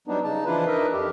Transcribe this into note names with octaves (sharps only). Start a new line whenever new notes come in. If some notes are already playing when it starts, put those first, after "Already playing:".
F#3 G3 B3 D4 D#4
C#3 D#4 A5
E3 F3 D4 E4 F4 B4
D4 D#4 A#4 B4 D#5 E5
F2 G4